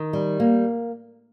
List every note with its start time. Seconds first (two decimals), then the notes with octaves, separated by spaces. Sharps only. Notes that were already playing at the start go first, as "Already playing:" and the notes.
Already playing: D#3
0.13 G3
0.40 A#3